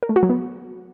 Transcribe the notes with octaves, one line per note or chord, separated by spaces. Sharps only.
A#4
A3
F#4
F#3
B3